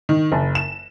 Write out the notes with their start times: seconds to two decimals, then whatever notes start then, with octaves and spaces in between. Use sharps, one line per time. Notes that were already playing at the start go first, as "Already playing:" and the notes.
0.09 D#3
0.32 F#1
0.55 E7